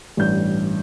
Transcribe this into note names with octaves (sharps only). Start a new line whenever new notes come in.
A1 G2 G6